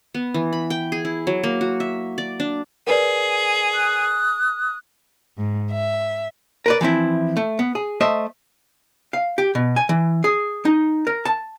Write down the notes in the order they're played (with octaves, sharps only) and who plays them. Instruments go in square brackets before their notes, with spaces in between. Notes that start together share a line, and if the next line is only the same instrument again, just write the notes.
[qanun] B3
E3
B5
G5
G#4
E4
F#3
A#3
F#4
E5
D5
D4
[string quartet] G#4 [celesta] A#4 B4 D5
[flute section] D#6 F#6
[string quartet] G#2
E5
[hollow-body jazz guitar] A#4 B4 D5
E3 F3 C4 E4
A3
B3
G#4
A3 C5 D#5 E5
F5
G4
B2
G#5
E3
G#4
D#4
A#4
A5